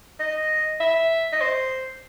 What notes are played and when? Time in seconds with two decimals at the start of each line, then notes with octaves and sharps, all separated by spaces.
0.20 D#5
0.80 E5
1.32 D#5
1.41 C5